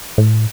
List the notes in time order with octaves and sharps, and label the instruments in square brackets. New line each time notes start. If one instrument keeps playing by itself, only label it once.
[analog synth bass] A2